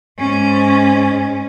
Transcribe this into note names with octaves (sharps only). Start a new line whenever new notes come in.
G#2 C#4